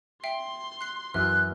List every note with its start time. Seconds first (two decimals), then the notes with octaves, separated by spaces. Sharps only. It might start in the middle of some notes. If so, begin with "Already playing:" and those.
0.24 E5 G5 C6 C7
0.81 F#6 C7
1.14 F#2 E3 E5 F6 F#6